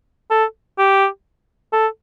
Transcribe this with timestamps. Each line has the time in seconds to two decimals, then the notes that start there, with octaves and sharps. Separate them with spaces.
0.31 A4
0.78 G4
1.73 A4